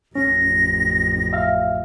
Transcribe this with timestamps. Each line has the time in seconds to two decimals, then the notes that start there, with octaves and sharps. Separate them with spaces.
0.15 A1 F2 C#4 A#6
1.33 E5 F5